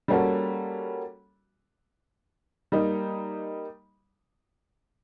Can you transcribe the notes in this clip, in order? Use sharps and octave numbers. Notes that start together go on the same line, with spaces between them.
G3 A#3 C#4 F#4 A4
G3 A#3 D#4